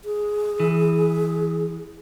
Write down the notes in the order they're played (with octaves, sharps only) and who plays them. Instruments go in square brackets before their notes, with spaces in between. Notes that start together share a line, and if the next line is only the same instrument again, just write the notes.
[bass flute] G#4
[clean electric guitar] E3